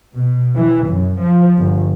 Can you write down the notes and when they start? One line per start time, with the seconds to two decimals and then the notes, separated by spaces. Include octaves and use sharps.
0.16 B2
0.56 E3
0.88 F#2
1.20 F3
1.58 G1